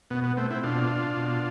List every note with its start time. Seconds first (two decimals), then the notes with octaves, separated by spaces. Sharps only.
0.10 B2 B3
0.24 B3
0.37 A3 C4
0.50 C4 E4
0.63 B2 D4 F4
1.17 B2